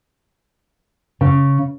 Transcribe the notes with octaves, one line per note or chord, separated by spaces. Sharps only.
C#3